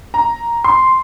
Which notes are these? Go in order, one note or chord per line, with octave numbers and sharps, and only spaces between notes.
A#5
C6